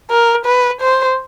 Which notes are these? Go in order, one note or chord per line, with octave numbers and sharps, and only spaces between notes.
A#4
B4
C5